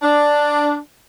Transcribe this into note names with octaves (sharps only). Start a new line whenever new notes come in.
D4